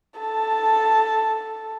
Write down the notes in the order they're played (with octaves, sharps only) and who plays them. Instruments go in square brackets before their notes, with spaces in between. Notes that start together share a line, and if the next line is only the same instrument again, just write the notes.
[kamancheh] A4 A5